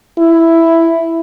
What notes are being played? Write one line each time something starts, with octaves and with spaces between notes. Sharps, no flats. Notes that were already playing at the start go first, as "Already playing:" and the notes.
E4